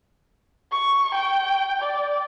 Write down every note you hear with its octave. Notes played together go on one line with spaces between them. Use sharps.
C#6
G5
D5